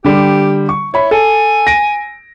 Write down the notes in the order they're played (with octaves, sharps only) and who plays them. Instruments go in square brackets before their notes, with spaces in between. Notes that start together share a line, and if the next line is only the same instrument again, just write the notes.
[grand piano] D3 G3 [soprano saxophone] G4
[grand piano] C#6
[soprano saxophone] E4 [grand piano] C#5 B5
[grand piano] A4 [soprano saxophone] G#5
[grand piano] A#6 D7